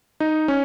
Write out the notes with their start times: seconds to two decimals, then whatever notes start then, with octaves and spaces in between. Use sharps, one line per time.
0.20 D#4
0.48 C#4